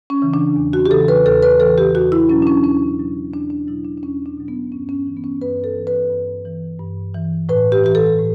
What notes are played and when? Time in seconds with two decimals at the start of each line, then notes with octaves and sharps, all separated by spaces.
0.10 C#4
0.22 C#3 E3
0.34 D4
0.56 E2
0.73 F#4
0.86 G4
0.91 C#3 E3 A4
1.08 B4
1.26 E2 A4
1.42 B4
1.60 C#3 E3 A4
1.78 G4
1.95 E2 F#4
2.12 E4
2.29 B2 F#3 C#4
2.42 D4
2.47 C#4
2.64 E2 C#4
2.98 B2 F#3
3.33 E2 D4
3.50 D4
3.67 B2 F#3 E4
3.85 D4
3.97 D4
4.03 E2 C#4
4.26 D4
4.37 B2 F#3
4.48 B3
4.72 G2 C#4
4.89 C#4
5.06 E3
5.17 B3
5.24 C#4
5.41 G2 B4
5.64 A4
5.76 E3
5.87 B4
6.10 G2
6.45 E3
6.79 G2
7.14 E3
7.49 A2 B4
7.72 G4
7.84 E3 G4
7.95 A4
8.19 A2